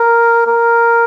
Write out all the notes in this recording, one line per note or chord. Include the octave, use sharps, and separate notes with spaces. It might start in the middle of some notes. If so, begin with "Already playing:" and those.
Already playing: A#4
A#4